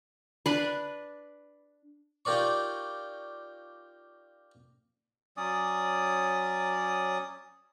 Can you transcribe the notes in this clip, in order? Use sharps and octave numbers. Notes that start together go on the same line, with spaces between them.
D4 B4
D#4 F4 G4 A#4 D5 C#6
F#3 C#4 D5 D#6